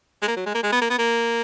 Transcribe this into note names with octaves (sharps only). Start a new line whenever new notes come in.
G#3
A#3
F#3
G#3
A#3
G#3
B3
A#3
B3
A#3